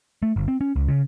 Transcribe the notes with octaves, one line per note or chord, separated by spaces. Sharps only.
A3
G1
C4
C#4
C#2
C#3